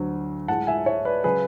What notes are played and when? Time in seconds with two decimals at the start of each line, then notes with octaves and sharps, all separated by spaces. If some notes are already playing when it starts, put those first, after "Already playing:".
Already playing: D2 D3 F#3
0.48 A2 G#3 F#5 A5
0.67 E5 G#5
0.86 C#5 E5
1.05 B4 D5
1.24 C#3 F#3 G#4 B4